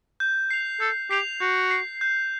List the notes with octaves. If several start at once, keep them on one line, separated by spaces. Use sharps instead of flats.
G6
C7 F7
A4 G6
G4 C7 F7
F#4 G6
C7 F7
G6